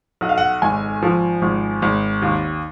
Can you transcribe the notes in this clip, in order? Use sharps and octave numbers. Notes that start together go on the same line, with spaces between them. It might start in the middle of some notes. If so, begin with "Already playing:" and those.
B1 F#5
F5
F#5
G#1 G#5
F3
G#1
G#1
D#2